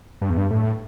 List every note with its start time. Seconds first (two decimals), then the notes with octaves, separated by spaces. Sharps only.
0.22 G2
0.30 E2
0.38 G2
0.51 A2